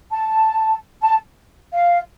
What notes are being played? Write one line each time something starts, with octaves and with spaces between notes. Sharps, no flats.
A5
A5
F5